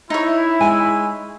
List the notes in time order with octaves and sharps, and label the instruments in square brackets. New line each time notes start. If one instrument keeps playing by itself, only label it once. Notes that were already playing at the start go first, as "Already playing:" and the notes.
[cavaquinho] D#4 C#5 [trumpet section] E4
[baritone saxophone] G#3 [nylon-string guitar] G#5